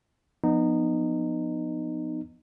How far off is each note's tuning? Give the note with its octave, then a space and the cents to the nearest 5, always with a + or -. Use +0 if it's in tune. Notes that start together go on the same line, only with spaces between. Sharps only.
F3 +0 B3 +0 D#4 -20